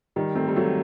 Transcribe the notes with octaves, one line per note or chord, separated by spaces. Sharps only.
D#3 G3
A3 C4
G3
F#3 A3